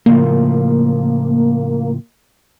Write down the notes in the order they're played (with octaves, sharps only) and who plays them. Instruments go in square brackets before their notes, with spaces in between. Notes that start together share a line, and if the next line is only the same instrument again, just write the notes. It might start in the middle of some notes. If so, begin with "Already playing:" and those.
[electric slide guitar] A2 C#3 F3 [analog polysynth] A#3